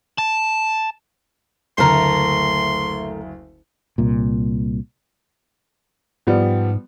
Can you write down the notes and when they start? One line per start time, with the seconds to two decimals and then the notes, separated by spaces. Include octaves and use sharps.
0.18 A5
1.78 F#1 D2 A3 A#4 C6
3.98 C2 A#2
6.27 G#2 F3 G3 B3